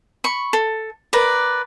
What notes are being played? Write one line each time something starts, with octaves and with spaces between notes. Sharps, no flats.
B5 C#6
A4
A#4 B4 D5